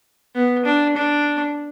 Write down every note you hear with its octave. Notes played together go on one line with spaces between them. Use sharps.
B3
D4
D4